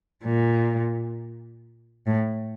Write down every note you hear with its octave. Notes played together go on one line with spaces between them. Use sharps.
A#2
A2